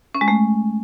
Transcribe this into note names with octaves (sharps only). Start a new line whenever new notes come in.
C#4
G#3
A3